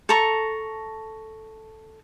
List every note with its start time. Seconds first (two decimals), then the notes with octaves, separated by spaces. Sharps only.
0.09 A4 A#5 C#6